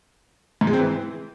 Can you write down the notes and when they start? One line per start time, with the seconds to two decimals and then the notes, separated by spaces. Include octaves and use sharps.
0.61 G#2
0.67 G#3
0.73 C4
0.79 E3